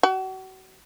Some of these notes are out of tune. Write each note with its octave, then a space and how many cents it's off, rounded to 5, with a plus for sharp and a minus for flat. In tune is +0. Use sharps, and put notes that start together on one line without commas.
F#4 +35